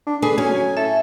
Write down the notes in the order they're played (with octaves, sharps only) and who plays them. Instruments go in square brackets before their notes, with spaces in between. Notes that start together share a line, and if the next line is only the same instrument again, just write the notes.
[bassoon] D4
[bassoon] D3 [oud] G#4 [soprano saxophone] B4
[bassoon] F#3 [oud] C#4 [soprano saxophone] G#5
[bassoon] A2 [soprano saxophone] A4 [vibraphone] E5